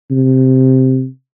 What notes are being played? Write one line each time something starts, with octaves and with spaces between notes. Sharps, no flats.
C3